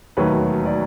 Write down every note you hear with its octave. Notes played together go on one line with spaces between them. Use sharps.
E1 D#2 D#3 F#3 A3 B4 C#5
D5